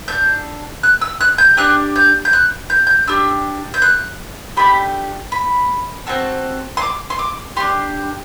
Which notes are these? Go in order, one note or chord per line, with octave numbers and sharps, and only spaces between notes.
D4 A4 G6
F#6
E6
F#6
G6
D4 G4 F#6
G6
G6
F#6
G6
G6
D4 G4 E6
G6
F#6
A3 D4 G4 B5
B5
C4 F#4 A4
C6
D6
C6
D6
D4 G4 C6